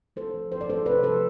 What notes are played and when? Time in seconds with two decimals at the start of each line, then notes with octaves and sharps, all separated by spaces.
0.16 A3 A4 C5
0.34 F3
0.52 F3 C5
0.61 D5
0.69 A3 A4 C5
0.86 C3 B4 D5
1.03 F3 A4 C5